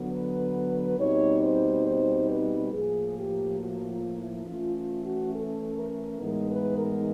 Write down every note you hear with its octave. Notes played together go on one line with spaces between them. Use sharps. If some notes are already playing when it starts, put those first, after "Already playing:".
Already playing: D3 F#3 B3
B4
B2 G3 C4 D#4 C#5
C5
C5
B4
A2 F3 A#3 G#4
G4
F#4
F4
E4
E3 A3 C#4 F4
F4
F#4
A4
A#4
A2 E3 G#3 B3 D#4 A#4
B4
A#4